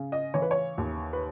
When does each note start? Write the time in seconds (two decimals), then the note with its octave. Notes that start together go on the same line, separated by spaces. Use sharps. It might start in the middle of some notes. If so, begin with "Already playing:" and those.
Already playing: C#3
0.12 D#5
0.34 E3 C#5
0.42 B4
0.51 C#5
0.78 D#2
1.13 B4